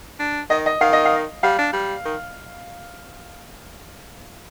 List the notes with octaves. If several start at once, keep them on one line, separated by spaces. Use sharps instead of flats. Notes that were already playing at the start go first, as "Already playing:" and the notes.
D4
D#3 D#5
D#5
D#3 F5
D#5
F5
G3 F5
D4
G3
D#3